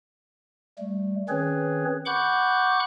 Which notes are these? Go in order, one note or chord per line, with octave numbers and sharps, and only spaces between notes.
G3 A3
D#3 C4 C#4 G#4 B4 C#5
F#5 B5 C#6 D6 F#6 G6